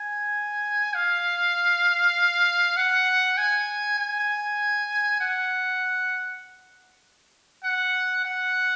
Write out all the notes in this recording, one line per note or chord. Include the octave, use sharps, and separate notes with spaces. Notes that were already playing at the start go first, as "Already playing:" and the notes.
Already playing: G#5
F5
F#5
G#5
G#5
F#5
F#5
F#5